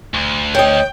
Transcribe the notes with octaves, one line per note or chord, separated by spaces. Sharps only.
D2
C#5 D#5 G5